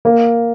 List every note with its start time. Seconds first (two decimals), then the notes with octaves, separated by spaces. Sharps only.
0.05 A#3